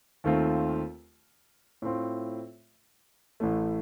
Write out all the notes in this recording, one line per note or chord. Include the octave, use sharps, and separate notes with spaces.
D#2 D#3 A3 C4 F4
A2 A3 C4 F4
A1 A2 A3